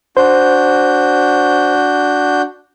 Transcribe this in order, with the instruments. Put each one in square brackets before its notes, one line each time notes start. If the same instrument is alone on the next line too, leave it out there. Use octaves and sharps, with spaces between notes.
[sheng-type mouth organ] D4 F#4 G6 [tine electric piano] C5